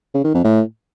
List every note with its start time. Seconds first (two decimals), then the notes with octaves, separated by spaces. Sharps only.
0.14 C#3
0.24 D#3
0.34 F2
0.44 A2